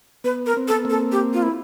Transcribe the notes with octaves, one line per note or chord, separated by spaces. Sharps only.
B3 B4
A#4
C4
A4
B3
A#3 C4 A4
G4
F4
E4